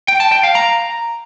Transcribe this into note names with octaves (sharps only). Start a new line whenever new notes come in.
G5
A5
G5
F5
A#5